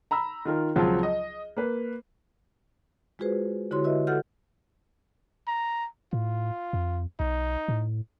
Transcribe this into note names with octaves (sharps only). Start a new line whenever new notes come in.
A#5 B5 E6
D#3 F4 A#4
C#2 F3 F#3 C4 F4 A5
D#5
A#3 B4
G#3 F4 F#4 G#4 B4 C5
D3 E4 F#4 G4 C#5 C6
E4 F#4 B4 D#5 E5
F#4 A4 F#5 F6 G6
A#5
A2 F4
F2
B1 D#4
A2